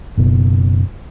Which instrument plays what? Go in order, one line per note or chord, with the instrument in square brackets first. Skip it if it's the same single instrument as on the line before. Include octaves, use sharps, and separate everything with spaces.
[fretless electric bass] F#1 B2